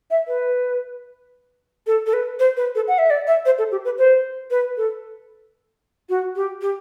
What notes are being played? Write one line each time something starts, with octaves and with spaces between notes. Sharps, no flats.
E5
B4
A4
A4
B4
C5
B4
A4
F#5
E5
D5
E5
C5
A4
G4
B4
C5
B4
A4
F#4
G4
G4